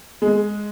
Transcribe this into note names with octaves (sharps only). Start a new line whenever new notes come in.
G#3